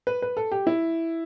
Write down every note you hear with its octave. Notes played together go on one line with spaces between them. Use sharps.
B4
B4
A4
G4
E4